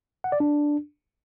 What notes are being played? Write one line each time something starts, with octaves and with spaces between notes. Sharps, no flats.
F#5
D5
D4